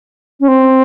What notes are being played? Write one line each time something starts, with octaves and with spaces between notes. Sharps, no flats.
C#4
C4